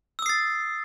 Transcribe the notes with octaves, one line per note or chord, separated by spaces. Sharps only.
D#6 E6 A6 C7